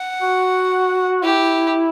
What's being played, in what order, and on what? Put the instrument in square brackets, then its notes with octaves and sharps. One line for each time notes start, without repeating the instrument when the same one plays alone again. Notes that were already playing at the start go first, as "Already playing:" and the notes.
Already playing: [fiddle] F#5
[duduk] F#4
[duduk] E4 [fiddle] G4